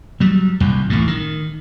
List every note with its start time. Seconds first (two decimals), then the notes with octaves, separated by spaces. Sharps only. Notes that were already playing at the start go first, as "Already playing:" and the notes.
0.20 F#3 G3
0.60 D#1 C2 F2
0.90 A1 D2 A2
1.07 D#3